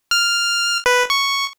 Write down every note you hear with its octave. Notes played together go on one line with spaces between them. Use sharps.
F6
B4
C#6